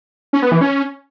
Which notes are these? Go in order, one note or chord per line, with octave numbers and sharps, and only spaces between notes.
C#4
B3
E3
C#4